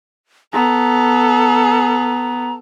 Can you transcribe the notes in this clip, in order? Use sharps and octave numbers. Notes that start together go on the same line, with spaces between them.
B3 A4 A#5